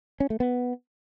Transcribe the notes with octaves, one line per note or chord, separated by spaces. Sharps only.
C#4
A3
B3